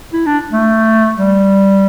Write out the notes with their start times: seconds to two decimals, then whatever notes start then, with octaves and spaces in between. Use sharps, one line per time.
0.13 E4
0.26 D4
0.52 A3
1.18 G3